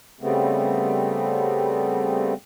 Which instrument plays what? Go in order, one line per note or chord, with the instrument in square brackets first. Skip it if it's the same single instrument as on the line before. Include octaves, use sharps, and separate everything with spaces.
[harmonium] C#3 G3 A3 B3 C4